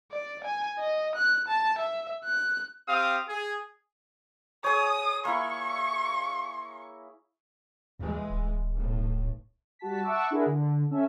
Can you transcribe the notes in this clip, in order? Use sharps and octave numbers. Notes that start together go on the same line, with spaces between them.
D5
G#5
D#5
F#6
A5
E5
F#6
C4 G4 F5 D#6
G#4
G#4 C#5 D#6
A#3 E4 C#6
D#2 E3 G#3
D1
B1 A2
G3 F#4 A5 B6
E5 F#5 A5 C#6 D6 E6
D4 E4 F#4 G#4 A#4
D3
C#4 A4 E5